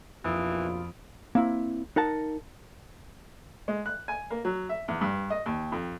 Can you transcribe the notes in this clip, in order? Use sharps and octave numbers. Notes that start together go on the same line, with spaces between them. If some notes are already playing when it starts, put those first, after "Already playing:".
A#1 F2 B2 E3 F4 B5 D#6 D7
A#3 C4 E4
D#4 A#4 F#5 A5
G#3
F#6
G#5
A#3
F#3
E5
E2
G2
D#5
D#2
F2